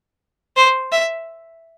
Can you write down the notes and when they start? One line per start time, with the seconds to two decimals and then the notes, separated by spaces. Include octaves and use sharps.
0.57 C5
0.92 E5